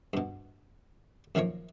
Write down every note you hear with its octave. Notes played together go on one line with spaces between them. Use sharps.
G2 B2
F#2 D#3 F3 A#3 C#5